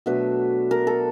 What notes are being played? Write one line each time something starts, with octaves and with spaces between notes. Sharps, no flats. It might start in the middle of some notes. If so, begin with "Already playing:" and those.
B2 F#3 A3 D4 B4
A#4
A4